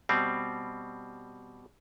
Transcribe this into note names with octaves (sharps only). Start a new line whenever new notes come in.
B2 G3 C4